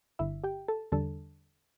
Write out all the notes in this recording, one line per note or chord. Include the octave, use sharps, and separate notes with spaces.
G1 G2 D3 E4 E5
G4 G5
A4 A5
E2 D3 G3 D4 A4 A5